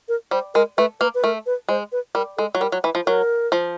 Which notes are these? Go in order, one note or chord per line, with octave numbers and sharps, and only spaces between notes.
A#4
G3 C5
G#3 A#4
A3 B4
A#3 B4
B4
A3 A#4
B4
G#3 C5
B4
G3 A#4
G#3 A4
F#3
G3 A#4
F#3
E3 B4
F3
F#3 A#4
F3